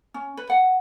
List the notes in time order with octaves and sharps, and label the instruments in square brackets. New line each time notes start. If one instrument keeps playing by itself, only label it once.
[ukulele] C#4
B4
F#5